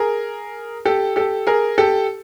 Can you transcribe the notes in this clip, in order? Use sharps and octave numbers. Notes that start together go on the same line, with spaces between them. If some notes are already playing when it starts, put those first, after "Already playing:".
Already playing: G#4 A#4
G4 A4
G4 A4
G#4 A#4
G4 A4